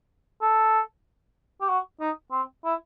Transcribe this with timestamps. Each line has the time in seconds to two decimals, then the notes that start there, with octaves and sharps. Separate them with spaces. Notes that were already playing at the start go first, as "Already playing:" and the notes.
0.41 A4
1.61 G4
1.69 F#4
2.00 D#4
2.32 C4
2.65 E4